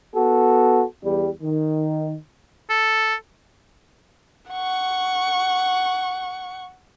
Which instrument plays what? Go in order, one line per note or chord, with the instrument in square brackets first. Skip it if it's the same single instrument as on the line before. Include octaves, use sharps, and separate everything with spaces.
[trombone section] B3 F#4 A4
E2 G3
D#3
[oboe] A4
[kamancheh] F#5 C#6